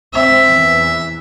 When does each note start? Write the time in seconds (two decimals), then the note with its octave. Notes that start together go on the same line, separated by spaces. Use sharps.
0.14 C4 E5
0.46 E2 E3